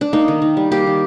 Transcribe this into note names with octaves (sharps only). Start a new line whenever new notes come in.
D4
A#3 D#4
D#3
D#3
G3
A#3 G4
D#3